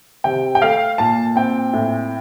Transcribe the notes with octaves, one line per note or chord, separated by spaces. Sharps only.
C3 G5
G5
A3 F5
A#2 A5
C4 G5
A2